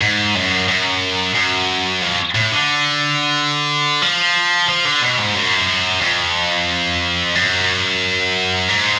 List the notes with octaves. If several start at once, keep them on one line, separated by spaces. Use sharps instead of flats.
G#2
F#2
F#2
F#2
F2
A2
D3
F3
F3
D3
B2
G#2
F#2
F2
F#2
G#2